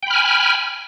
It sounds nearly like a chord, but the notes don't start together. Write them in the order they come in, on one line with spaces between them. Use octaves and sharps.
G5 B5 F6 G#5